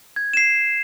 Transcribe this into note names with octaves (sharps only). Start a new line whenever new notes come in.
G#6
C7 E7